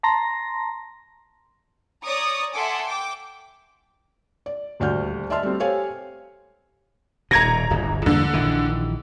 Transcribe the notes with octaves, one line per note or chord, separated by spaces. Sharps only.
A5 A#5 C6 A#6
C#5 D5 A#5 C#6 D#6
A4 E5 F#5 G#5 C6 D6
G5 D6
D5
D#1 D2 F#4 D5 F6 G6
D5 E5 A5 C6 F6
G3 A3 C4
G4 A4 C5 C#5 F5 G#5
D#1 B2 A#5 G#6 A#6
D1 G1
E2 G2 D3 A#3
A#1 D#3 E3